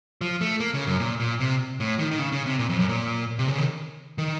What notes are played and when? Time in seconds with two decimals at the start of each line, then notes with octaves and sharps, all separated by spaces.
0.21 F3
0.41 A3
0.60 A#3
0.74 C#3
0.87 F#2
1.00 A#2
1.20 A#2
1.40 C3
1.80 A2
1.99 D#3
2.11 D#3
2.19 C#3
2.32 C#3
2.46 C3
2.59 A#2
2.70 F2
2.79 F#2
2.89 A#2
3.39 C3
3.48 C#3
3.58 D#3
4.18 D#3